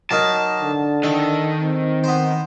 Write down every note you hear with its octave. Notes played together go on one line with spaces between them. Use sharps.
F#3 A#3 D#4 A5
D3
D#3 A4
C4
B3 C5